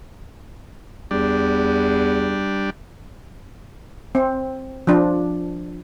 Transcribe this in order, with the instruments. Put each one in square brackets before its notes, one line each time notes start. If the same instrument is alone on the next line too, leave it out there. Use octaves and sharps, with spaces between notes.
[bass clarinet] E2 [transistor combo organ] G3 D4
[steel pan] C4
F3 D4